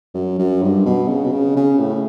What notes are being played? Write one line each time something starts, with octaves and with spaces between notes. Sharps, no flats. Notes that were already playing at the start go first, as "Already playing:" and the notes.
F#2
F#2
G2
B2
C#3
B2
C#3
C#3
A2